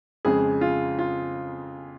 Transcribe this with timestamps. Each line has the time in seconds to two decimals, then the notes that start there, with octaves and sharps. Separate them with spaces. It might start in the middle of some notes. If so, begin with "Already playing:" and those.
0.25 F2 C#3 G#3 G#4
0.61 F4
0.99 F4